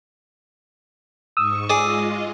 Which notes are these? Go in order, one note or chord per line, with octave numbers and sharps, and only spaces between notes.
G#2 C#6 D#6 E6
G#3 F4 G#4 D5 D#5